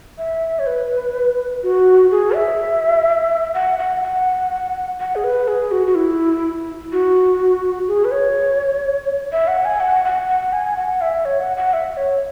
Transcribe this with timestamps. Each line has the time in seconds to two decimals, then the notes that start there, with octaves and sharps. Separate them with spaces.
0.18 E5
0.59 C#5
0.67 B4
1.63 F#4
2.11 G#4
2.35 E5
3.55 F#5
3.79 F#5
4.03 F#5
5.00 F#5
5.16 G#4
5.24 B4
5.48 G#4
5.71 F#4
5.87 F#4
5.95 E4
6.92 F#4
7.88 G#4
8.05 B4
8.11 C#5
9.32 E5
9.48 F#5
9.65 G#5
9.80 F#5
10.05 F#5
10.28 F#5
10.53 G#5
10.77 F#5
11.01 E5
11.25 C#5
11.40 F#5
11.57 F#5
11.73 E5
11.97 C#5